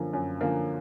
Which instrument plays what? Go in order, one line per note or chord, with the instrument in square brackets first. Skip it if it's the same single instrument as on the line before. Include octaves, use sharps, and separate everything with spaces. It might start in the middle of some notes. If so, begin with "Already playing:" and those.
Already playing: [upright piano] F#2 D3 F3 A#3
F#2
D3 F3 A#3